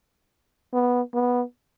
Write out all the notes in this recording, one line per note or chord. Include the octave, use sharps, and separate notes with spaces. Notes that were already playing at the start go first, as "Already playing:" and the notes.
B3
B3